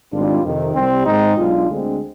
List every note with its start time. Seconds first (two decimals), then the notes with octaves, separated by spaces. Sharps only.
0.12 G#1 G#2 G3 D4 F4
0.43 F2 C3 D#3
0.75 C2 C3 G3 C4
1.06 G#2 D#3 G#3 C4 D#4
1.37 B1 B2 G#3 D4 F4
1.68 D2 D3 G#3 C4